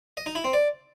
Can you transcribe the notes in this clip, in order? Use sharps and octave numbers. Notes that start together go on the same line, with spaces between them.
D#5
D#4
E4
C4
D5